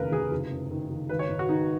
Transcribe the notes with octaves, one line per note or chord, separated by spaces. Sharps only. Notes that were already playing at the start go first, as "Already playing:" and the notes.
Already playing: F1 D#2 C#3 A#4 B4
F1 G#4
F#1
F#2
D#3
F#1
G#1 B4
C#5
G#2
F#4
D#3 D#4